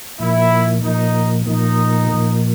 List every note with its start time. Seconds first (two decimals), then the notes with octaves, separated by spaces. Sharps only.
0.19 A#2 F3 A#3 E4
0.82 A#2 F3 A#3 D#4
1.46 A#2 F3 A#3 D#4
2.09 A#2 F3 A#3